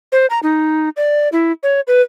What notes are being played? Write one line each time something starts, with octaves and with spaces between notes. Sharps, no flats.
C5
A#5
D#4
D5
E4
C#5
B4